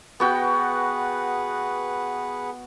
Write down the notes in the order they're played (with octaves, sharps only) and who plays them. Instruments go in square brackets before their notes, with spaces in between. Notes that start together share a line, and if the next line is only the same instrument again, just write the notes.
[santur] B3 F#4 G5 [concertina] G#4 B4 F#5